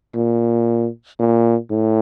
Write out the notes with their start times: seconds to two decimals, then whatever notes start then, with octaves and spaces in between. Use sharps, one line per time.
0.14 A#2
1.19 A#2
1.71 A2